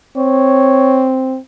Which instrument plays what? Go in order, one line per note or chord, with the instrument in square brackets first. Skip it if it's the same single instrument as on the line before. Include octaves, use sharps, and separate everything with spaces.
[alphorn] C4 [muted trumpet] C#5